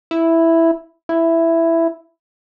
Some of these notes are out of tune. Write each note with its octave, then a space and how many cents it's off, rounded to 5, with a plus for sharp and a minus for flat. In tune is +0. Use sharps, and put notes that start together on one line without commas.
E4 +0
E4 +5